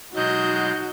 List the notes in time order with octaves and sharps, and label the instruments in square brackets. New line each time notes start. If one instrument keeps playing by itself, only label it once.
[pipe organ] B2 F#3 G#3 [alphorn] D#4 [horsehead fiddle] F#4 [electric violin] D#5 G6